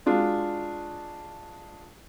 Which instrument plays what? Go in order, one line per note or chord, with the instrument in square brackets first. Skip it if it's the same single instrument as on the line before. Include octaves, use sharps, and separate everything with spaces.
[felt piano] G#3 D4 F4 F#4